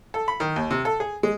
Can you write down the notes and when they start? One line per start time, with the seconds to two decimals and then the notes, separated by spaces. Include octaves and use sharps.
0.14 A4
0.28 B5
0.40 D#3
0.56 D#2
0.71 C3
0.85 A4
1.00 G#4
1.23 G#3